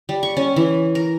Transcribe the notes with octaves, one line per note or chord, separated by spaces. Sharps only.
G3
C#6
C#4
E3
A#4